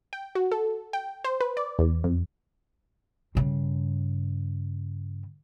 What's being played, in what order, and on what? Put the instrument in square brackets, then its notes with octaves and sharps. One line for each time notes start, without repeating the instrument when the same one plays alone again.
[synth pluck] G5
F#4
A4
G5
C5
B4
D5
E2
F2
[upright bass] G2 C#3